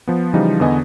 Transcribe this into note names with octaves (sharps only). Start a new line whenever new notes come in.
F3 B3
C#3 E3 F3 G3 D#4
E2 D3 B3 D#5 G#5